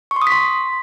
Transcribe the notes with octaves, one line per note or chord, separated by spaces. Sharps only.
C#6
C6
D#6
B6
C6